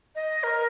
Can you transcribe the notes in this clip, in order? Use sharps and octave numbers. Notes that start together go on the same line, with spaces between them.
D#5
A#4